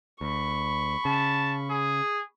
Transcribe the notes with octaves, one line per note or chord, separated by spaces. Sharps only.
D2 B5 C#6
C#3 A5
G#4